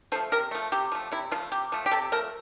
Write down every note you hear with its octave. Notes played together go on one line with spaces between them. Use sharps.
F3 A3 C5
C3 A#4
F3 A3
C3 G4
F3 A3
C3 E4
F3 A3 F4
C3 G4
F3 A3
G4
C3 A4
F3 A3 A#4